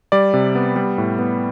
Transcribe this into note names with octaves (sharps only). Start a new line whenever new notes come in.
G3 D5
C3
B3
G3
A2
B3